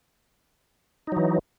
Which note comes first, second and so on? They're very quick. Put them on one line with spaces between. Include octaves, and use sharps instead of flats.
D#4 F#3 E3